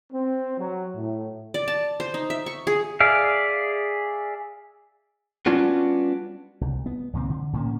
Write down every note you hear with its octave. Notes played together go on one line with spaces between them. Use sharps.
C4
F#3
A2
D5
A5
C5
D#4
E5
C#6
G#4
G#4 D5 E5 F5
G3 B3 C#4 D4 F4 F#4
C2
B3
C#2 A#2 D#3 C4
D3
A2 D3 A#3 C#4